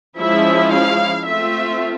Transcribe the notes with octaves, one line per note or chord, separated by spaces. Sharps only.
F3 G#3 C#4 E4 E5
F5
A3 C4 F4 E5